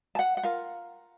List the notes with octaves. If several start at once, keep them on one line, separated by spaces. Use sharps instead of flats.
A5
F#5
F#5
F4 A#4 F5